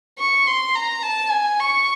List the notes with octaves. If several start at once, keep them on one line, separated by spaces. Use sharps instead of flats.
C#6
C6
A#5
A5
G#5
C#6